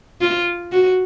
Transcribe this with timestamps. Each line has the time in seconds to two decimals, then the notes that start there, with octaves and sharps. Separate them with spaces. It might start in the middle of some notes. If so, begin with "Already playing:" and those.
0.21 F4
0.72 F#4